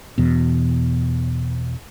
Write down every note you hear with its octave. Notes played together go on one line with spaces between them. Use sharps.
E2 B2